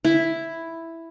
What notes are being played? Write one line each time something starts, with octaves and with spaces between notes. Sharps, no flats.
E4